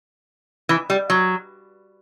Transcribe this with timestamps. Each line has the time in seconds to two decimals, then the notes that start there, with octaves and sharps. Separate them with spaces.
0.69 E3
0.90 G3
1.10 F#3